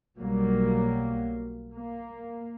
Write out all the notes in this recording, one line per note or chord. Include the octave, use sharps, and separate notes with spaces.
B1 F#3 G3 A#3
A#3